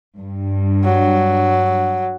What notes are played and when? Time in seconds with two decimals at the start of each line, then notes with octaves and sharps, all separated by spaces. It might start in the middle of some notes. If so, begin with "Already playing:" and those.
0.17 G2
0.84 F#3